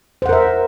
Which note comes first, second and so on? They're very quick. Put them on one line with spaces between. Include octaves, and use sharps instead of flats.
C5 F#5 A#4 E5